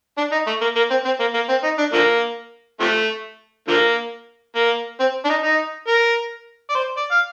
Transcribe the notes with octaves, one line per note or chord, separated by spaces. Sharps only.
D4
D#4
A3
A#3
A#3
C4
C4
A#3
A#3
C4
D#4
D4
D3 F3 A#3
C3 F3 A3
D3 F3 A#3
A#3
C4
D4
D#4
D#4
A#4
D5
C5
D5
F5